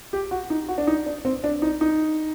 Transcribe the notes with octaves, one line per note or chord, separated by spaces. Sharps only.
G4
F#4
D#4
F#4
D4
D#4
D4
C4
D4
D#4
D#4